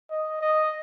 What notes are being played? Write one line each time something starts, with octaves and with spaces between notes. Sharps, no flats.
D#5
D#5